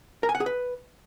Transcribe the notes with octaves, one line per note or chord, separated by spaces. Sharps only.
A#4
G#5
F#5
G#4
B4